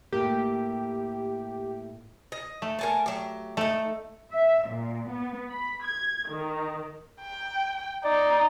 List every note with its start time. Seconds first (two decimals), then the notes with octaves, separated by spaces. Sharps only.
0.13 A2 A#3 G4
2.32 D#5
2.62 A3
2.79 A#4 G#5 A5
3.06 F#3 G4
3.57 A3 D#4 A4
4.31 E5
4.68 A#2
5.08 B3
5.49 B5
5.84 G#6
6.27 D#3
7.21 G5
8.04 D#4 D5